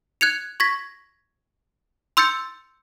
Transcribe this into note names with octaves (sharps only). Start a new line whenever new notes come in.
F#6 G#6 C#7 F7
C#6 G#6 A#6 B6
C6 E6 G6 A6 C#7